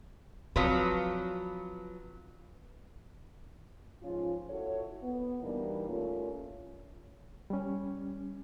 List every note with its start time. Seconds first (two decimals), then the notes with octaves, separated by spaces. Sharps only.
0.56 F3 F#3 C4 B4
4.03 G#2 F3 C#4 F4
4.50 E4 F#4 A4 C#5
5.03 B3
5.43 B2 E3 G3 A#3 D4 D#4
5.87 A3 A#3 C#4 F4
7.50 G3 C#4